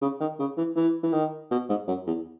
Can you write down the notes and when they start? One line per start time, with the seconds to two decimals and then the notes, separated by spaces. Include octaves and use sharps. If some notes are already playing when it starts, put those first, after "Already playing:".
0.01 C#3
0.20 D#3
0.39 C#3
0.57 E3
0.76 E3
1.03 E3
1.13 D#3
1.51 B2
1.69 G#2
1.88 F#2
2.06 E2